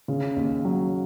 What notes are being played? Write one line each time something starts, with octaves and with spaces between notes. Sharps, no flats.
C#3
D#2
F#3